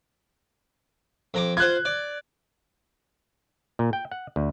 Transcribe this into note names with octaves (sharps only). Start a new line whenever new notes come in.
F2 A#5 D6
F4 C5 F#6 G#6
D5
A#2
G5
F#5
D2